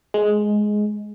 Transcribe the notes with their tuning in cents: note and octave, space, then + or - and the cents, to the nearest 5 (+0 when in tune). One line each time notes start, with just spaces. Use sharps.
G#3 +10